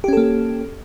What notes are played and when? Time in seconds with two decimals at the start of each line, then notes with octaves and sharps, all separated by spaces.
0.04 G4
0.08 C#4
0.13 A4
0.17 A#3